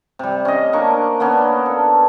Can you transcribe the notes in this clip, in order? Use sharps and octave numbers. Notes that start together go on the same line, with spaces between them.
C3 G3
C#4 D#5
A#3 D4 C#6
A#3 B3 C#4 D4
A4